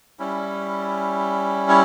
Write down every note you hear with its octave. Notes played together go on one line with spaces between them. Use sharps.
G3 C#4 E4
C#5